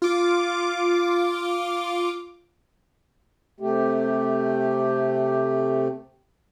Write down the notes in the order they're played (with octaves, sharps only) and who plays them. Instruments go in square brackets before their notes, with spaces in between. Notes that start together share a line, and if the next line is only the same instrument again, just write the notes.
[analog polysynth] F4 D6
[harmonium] C3 A3 G4